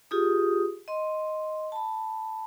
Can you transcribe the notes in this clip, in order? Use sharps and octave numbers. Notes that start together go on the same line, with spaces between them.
F4 G4 G#4 D#6
D#5 C6
A5 B5